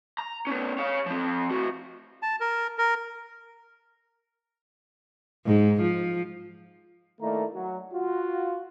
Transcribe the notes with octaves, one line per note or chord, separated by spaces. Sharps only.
A#5
B3 C#4
C#5 F5
F3 C4
A2 F#4
A5
A#4
A#4
G#2
F3
D#3 A3 A#3 E4 D5 A#5
F#3
F4 F#4